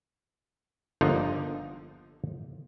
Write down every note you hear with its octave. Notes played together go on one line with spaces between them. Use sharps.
G1 D3 F3 A#3 D#4